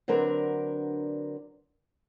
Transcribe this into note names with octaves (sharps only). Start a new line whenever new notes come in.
D3 F#3 C4 D4 A#4 B4